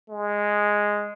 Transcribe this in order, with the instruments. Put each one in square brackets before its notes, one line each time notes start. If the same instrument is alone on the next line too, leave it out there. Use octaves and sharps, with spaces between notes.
[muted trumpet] G#3